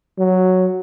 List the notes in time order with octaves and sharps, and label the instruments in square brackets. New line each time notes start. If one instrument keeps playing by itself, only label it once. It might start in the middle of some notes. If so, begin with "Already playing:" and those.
[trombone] F#3